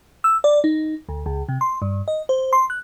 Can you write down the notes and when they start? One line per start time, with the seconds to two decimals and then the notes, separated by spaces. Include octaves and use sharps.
0.24 E6
0.44 D5
0.64 D#4
1.09 D2
1.26 C#2
1.49 C3
1.61 C6
1.82 G2
2.08 D#5
2.29 C5
2.53 C6
2.70 F#6